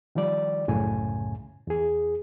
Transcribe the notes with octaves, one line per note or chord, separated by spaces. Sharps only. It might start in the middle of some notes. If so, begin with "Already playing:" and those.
D#3 F3 G3 D5
C2 F#2 A2 C#3 G#5
E2 G#4